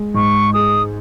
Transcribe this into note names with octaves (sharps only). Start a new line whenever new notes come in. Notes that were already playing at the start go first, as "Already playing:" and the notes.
Already playing: G#3
G#2 C#6
G#4 D#6